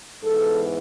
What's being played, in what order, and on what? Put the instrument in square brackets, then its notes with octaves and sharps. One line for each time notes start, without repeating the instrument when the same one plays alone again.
[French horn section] G#2 E3 B3 A4